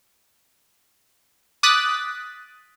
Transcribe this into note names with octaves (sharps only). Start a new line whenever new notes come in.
D6 D#6 F#6 A6 B6